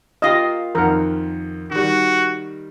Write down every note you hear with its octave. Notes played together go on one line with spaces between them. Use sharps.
A#3 F4 G4 D#5
F2 D#3 A#4 F#5
D#3 G3 F#4